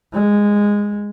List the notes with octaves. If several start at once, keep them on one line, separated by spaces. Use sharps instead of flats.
G#3